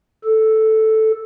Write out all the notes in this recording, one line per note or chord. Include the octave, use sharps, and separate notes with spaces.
A4